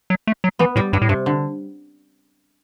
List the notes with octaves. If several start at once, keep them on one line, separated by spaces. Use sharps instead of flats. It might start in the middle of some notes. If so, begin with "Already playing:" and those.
F#3
A3
F#3
E3 B3
A2 G3
G2 G3
A2
G2 C3
D3